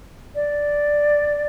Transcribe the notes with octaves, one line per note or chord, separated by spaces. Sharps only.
D5